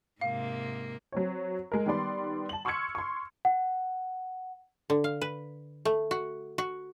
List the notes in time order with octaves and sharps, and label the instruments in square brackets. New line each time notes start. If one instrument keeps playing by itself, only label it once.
[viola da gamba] G#2 C3 A#3 [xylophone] F5
[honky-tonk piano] F#3 C4 C#5
G#3 A#4
D#3 G3 B3 D5 C6
A5 F#7
C6 C#6 E6 F6 G#6 C#7
C6 C#6
[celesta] F#5
[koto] D3
F5
B4
A3
F#4
F#4